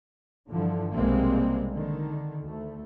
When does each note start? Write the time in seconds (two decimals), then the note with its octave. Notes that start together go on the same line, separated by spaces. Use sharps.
0.48 G2 D3 E3 F3
0.93 B1 C3 G3 G#3 A#3 C4
1.70 D3 D#3
2.43 D2 A3